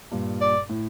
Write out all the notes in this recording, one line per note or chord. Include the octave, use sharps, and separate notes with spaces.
G2 A#2
D5
A2